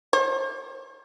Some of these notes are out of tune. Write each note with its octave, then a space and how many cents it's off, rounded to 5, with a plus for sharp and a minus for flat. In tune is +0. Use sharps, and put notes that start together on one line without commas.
C5 +35